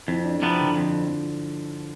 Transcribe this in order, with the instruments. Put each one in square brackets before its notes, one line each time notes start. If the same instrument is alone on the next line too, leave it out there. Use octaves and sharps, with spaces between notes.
[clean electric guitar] F2 [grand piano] E4
[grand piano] D4
[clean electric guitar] C3 G3 B3 [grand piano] F3
[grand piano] D3
[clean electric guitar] F2